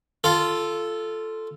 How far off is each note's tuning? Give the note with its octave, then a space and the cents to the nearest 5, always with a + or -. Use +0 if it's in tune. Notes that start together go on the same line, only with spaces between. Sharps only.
F4 -10 A4 +0